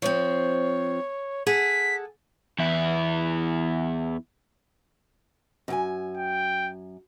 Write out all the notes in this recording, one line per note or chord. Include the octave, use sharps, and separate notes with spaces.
F3 C4 C#5
G#4 A4 F#5 B6
E2 E4
F#2 G4 G#5
G5